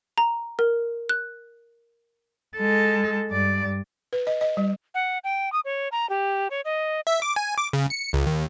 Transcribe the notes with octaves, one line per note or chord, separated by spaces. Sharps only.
A#5
A#4
F#6
G#3 A4
G2 D5
B4
D#5
D#5
G3
F#5
G5
D#6
C#5
A#5
G4
C#5
D#5
E5
D6
G#5
D6
C#3
C#7
C#2
D#2